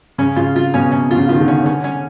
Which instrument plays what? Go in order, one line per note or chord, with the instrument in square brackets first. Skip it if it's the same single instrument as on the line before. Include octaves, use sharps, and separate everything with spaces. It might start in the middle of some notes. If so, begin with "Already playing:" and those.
[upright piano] C#3 [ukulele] C#4
[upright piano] C#3 [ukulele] F4
[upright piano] C3 [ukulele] F4
[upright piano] B2 [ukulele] C#4
[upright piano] C3 [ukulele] C#4
[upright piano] D3 [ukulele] F4
[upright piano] C#3
[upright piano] D#3 [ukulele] F4
[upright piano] D3
[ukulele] C#4
[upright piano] D3 [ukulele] C#4
[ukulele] C#4